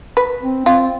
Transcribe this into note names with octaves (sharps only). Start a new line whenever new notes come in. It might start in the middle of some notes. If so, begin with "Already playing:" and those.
B4
C4
C4 F4